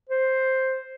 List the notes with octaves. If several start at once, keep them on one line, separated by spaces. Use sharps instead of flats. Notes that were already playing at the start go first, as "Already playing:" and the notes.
C5